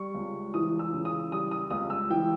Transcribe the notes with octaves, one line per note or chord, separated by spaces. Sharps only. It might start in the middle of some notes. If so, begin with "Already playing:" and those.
Already playing: G3 C#6
C#2
E3 D#6
E6
C#3
D#6
G3 D#6
D#6
C#2 D#6
E6
E3 G5